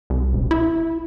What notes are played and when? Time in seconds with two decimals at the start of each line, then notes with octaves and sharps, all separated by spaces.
0.10 C2
0.33 E1
0.51 E4